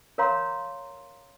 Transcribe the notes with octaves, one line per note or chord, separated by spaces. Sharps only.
A#4 C#5 F5 A#5 C6